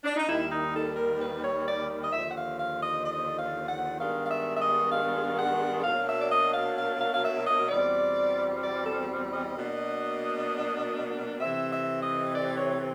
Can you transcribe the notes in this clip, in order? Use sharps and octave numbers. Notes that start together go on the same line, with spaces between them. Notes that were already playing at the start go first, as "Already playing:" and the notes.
D4
D#4
D#2 D#3 G3 E4
D#4
A4
A#4
B4
C#5
D5
D#5
D#2 D3 F3 E5
F#5
F5
F5
D#5
D#5
F5
F#5
G2 D#3 G#3 B3 D4 F5
F5
E5
E5
D#5
F5
F#5
B2 F#3 A#3 D4 F5
E5
D5
D#5
F5
F5
F5
F5
E5
D#5
E2 B2 G3 C4 D5
D5
A4
D#5
B2 F#3 A#3 D4
C3 E3 A3 C4 E5
E5
D#5
D5
C#5